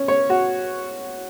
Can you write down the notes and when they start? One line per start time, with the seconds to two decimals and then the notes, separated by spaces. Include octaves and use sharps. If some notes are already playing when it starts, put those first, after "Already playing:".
Already playing: C#4
0.08 C#5
0.30 F#4